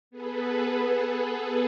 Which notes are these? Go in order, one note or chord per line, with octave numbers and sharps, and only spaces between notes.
B3 G#4 A4 B4